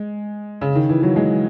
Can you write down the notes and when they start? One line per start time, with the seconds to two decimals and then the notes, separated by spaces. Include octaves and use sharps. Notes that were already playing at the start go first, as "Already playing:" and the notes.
Already playing: G#3
0.61 C#3
0.75 D#3
0.89 E3
1.03 F#3
1.16 G#3